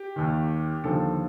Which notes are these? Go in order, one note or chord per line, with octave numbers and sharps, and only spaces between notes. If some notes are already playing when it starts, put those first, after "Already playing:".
Already playing: G4
D#2 D#3
D#2 D3 F3 A4